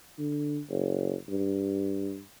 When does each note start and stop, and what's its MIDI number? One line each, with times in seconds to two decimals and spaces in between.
0.18 0.61 50
0.69 1.14 30
1.29 2.20 43